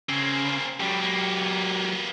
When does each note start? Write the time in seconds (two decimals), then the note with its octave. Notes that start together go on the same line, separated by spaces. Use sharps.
0.09 C#3 A#3 C4
0.80 A2 F#3 G3 G4
1.02 A#3 B3